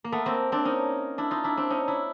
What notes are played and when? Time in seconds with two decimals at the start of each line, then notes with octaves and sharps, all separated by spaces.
0.04 A#3
0.12 A3 B3
0.26 A#3 C4
0.52 C4 D4
0.65 C#4 D#4
1.18 D4 E4
1.31 D#4 F4
1.44 D4 E4
1.57 C4 D4
1.70 C#4 D#4
1.88 D4 E4